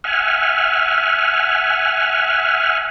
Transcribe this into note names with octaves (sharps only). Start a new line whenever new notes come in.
E5 F#5 G#5 F6